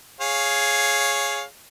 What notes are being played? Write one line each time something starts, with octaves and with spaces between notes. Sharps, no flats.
G#4 C#5 F5